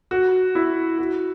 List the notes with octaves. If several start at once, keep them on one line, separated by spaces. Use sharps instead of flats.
F#4
E4
F#4